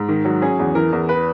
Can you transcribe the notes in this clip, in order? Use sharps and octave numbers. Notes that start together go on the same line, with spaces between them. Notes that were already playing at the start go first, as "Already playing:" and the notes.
Already playing: G#2
D#3
F#3
C#4 G#4
E2
E3 A#4
E2
B4